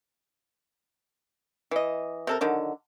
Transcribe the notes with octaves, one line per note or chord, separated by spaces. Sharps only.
E3 D#5
C3 A4 A#4
D3 D#3 F#3